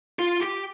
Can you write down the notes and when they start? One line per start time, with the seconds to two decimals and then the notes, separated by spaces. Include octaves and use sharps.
0.19 F4
0.41 G4